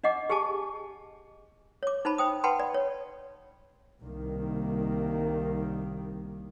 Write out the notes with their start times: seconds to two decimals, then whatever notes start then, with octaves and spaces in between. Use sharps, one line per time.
0.04 D4 D#5 F#5 D6
0.30 G4 G#4 G#5 A5 D6
1.83 C#5 D6
2.05 D#4 C5 A5 B5
2.18 C5 G5 D#6
2.44 B4 F#5 G5 A5 B5 C6
2.60 D5
2.74 C#5
4.02 C2 D#3 G3 A#3